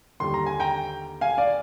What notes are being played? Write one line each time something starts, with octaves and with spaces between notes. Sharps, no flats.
D#2 D3 G3 C6
A#5
G#5
G5 A#5
F5 G#5
D5 F5